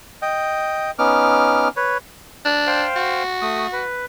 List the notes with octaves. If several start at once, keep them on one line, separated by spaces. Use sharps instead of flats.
D#5 G5
B3 C#4 D#4 D6 F6
B4 C#5
D4
C5 F5 G5
F#4
A3 D#6
B4